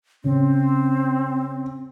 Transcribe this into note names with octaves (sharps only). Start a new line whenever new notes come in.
C#3 C4